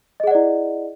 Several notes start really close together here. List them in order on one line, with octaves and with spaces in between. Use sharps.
D#5 G#4 F#5 D5 E4